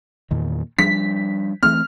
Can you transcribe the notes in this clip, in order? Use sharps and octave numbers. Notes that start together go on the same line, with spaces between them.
E2 A#2 D#3
F3 G3 D4 B6
E3 A3 C4 F6